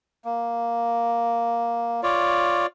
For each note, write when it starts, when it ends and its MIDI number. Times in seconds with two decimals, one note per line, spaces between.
0.25 2.01 58
2.03 2.66 65
2.03 2.66 73
2.03 2.66 74